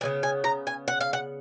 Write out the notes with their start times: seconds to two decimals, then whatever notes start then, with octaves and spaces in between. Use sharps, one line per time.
0.01 C#3 G#3 B3 G#5
0.23 G#5
0.44 A#5
0.67 G#5
0.88 F#5
1.01 F5
1.13 F#5